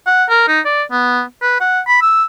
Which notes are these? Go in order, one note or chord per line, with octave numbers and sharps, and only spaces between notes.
F#5
A#4
D#4
D5
B3
B4
F#5
B5
E6